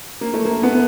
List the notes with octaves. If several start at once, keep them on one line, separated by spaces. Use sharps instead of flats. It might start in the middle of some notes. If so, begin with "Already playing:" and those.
A#3
A3
A#3
B3